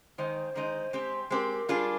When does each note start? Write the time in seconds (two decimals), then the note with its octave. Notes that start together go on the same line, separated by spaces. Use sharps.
0.18 D#3 G#3 D#4 C5
0.56 D#3 G#3 D#4
0.93 G#3 C4 G4
1.31 G#3 C4 G4 A#4 C5
1.69 G3 D4 F4 G#4